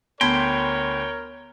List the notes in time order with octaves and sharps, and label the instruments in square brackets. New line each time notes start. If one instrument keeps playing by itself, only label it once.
[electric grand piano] D2 B5 C6 [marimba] B3 G#6 [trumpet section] A#4 C#5 [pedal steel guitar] G5